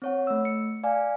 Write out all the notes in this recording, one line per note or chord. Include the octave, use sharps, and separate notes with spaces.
C4 C#5 F#5
A3 E6
C#7
D5 F5 G#5